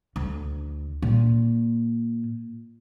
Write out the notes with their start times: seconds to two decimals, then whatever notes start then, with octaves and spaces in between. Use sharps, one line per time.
0.16 D2
1.02 A#2